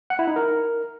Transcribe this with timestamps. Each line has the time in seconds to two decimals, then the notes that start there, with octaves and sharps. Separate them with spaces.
0.10 F#5
0.19 E4
0.28 D#4
0.36 A#4